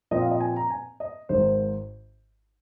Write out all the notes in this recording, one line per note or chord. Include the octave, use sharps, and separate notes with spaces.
A#2 F3 C4 D#5
F5
D#5
G#5
A#5
G#5
D#5
G#1 G#2 D#3 C5